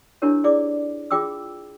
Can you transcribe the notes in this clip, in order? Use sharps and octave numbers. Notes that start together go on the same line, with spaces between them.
D4 E4 G4 A#4 C#5
E4 G#4 D5 D6
F4 G#4 G5 D6 E6